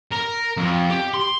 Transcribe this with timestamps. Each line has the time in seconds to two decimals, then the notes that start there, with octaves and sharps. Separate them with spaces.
0.12 A#4
0.57 F2
0.90 G4
1.14 C6